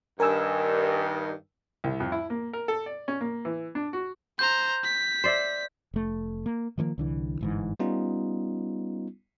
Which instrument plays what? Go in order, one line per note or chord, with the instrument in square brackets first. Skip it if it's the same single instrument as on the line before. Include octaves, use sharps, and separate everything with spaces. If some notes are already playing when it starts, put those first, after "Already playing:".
[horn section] G2 D#3 [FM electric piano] A#4 G#5 E6
[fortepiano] C2
F2
E4
A#3
A#4
A4
D5
C#4
A#3
E3
D4
F#4
[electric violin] C5 A#5 [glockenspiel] G6
[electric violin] B6
[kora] C5 D5 E5
[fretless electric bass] F1 A3
A#3
D#3 F3 A3 A#3
C2 D3 E3
G1 G#2 E3
[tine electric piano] G3 B3 C#4 D#4 F4